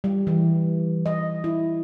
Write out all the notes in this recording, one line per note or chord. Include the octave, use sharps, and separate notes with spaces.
G3
E3
D#5
E4